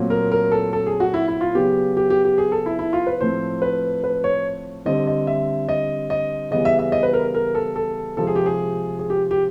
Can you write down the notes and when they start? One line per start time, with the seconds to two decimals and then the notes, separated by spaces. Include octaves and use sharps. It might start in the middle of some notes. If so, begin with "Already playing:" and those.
Already playing: A#2 F#3 A3 C4
0.10 A#4
0.32 A#4
0.52 A4
0.73 A4
0.86 G#4
1.00 F#4
1.14 E4
1.28 E4
1.41 F4
1.55 C#3 F#3 B3 G4
1.97 G4
2.10 G4
2.25 G4
2.38 G#4
2.52 A4
2.66 E4
2.79 E4
2.93 F4
3.07 B4
3.20 A2 F3 A3 C4 C5
3.62 B4
4.04 B4
4.24 C#5
4.85 D3 G3 C4 D#5
5.07 D#5
5.27 E5
5.69 D#5
6.10 D#5
6.51 C#3 E3 G3 B3 D#5
6.65 E5
6.79 E5
6.92 D#5
7.03 B4
7.13 A#4
7.35 A#4
7.55 A4
7.76 A4
8.17 C3 F3 G#3 A4
8.27 G#4
8.36 G4
8.46 G#4
8.99 G#4
9.10 G4
9.31 G4